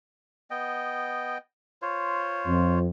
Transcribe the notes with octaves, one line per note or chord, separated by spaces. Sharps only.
B3 D#5 G5
F4 C5 C#5
F2